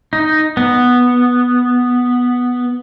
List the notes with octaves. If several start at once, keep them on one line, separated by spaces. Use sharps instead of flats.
D#4
B3